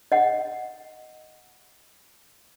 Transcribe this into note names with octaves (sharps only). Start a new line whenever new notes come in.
D#5 F#5